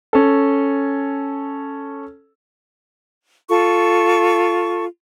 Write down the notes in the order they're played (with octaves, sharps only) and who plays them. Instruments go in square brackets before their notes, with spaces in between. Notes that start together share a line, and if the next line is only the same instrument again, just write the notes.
[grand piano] C#4 A4
[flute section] F4 A4 C#6